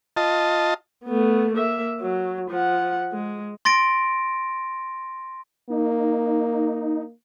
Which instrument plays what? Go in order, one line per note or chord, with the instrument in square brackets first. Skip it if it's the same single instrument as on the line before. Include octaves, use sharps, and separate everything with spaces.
[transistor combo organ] F4 D#5 A5
[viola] A3 B3
A#3 E5
F#3
F3 F#5
G#3
[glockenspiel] C6 A6 A#6 D7
[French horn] A#3 [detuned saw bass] D#4